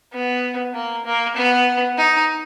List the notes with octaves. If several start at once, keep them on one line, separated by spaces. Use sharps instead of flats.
B3
A#3
A#3
B3
D#4